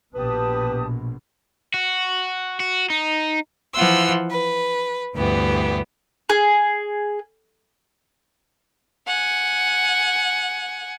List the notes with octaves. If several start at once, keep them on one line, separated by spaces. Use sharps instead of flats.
A#1 B2 G4 B4 A5 D#6
F#4
F#4
D#4
E3 F3 F4 F#5 C6 E6
B4
D2 G2 E3 B3 G4
G#4
F#5 G#5